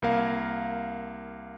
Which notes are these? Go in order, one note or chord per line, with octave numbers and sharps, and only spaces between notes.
C2 A#3 A#4 F5